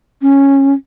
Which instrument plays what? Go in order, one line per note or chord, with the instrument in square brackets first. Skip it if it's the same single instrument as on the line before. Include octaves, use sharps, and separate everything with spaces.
[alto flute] C#4